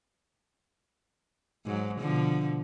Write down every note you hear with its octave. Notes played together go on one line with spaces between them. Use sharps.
G#2 F#3
B2 D3 F3